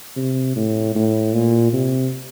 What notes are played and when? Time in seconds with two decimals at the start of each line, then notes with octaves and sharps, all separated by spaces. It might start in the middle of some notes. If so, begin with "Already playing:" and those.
0.16 C3
0.56 A2
0.96 A2
1.33 A#2
1.73 C3